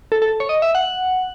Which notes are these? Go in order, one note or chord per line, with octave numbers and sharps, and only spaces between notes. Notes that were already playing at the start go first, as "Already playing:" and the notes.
A4
A4
C#5
D#5
E5
F#5